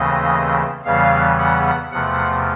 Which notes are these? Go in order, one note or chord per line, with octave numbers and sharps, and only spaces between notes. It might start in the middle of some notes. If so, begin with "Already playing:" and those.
Already playing: D#2 C#3 E3 A3 C4 D#5
E2 C#3 E3 G3 B3 F5
F#5
E2 C3 F3 A3 F#5